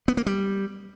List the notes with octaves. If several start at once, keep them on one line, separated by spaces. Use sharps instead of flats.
B3
A#3
G3